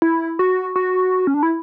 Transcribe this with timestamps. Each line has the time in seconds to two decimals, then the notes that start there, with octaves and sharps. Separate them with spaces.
0.02 E4
0.39 F#4
0.76 F#4
1.27 C#4
1.34 D4
1.43 E4